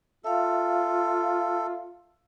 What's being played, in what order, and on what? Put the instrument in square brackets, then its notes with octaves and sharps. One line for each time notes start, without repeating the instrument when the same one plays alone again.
[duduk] F4 [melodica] A4 [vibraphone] E5 F5